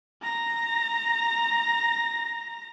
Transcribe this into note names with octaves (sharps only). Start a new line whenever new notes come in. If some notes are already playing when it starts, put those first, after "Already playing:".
A#5 A#6